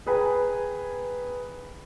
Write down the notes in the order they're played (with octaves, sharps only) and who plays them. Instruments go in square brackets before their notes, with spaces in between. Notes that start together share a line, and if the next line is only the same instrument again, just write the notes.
[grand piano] G#4 B4 G5 G#5 A#5